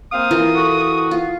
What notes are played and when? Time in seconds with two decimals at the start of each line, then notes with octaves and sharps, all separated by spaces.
0.12 A#3 C4 F5 D#6
0.31 E3 F4 A#4
0.55 F#4 A4
1.11 F4